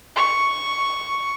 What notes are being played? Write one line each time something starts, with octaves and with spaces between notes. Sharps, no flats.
C#6